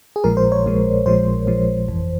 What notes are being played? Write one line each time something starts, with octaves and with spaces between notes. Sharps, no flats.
G#4
A#1 A#2 F3 G#3 A#4
C5
C#5
A#1 A#2 F3 G#3
A#1 A#2 F3 G#3 C5
A#1 A#2 F3 G#3
G1 F2 E3